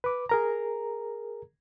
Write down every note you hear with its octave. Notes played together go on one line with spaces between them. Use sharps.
B4 D6
G#4 A#4 A#5